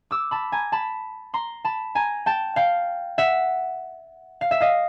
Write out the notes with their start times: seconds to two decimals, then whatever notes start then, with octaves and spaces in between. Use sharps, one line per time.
0.11 D6 E6
0.31 A5 B5
0.52 G#5 A#5
0.72 A5 B5
1.34 A#5 C6
1.65 A5 B5
1.95 G#5 A#5
2.26 G5 A5
2.56 F5 G5
3.18 E5 F#5
4.41 F5
4.51 E5
4.61 D#5 F5